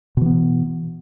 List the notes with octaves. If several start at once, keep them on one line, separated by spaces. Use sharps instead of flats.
B2 E3 B3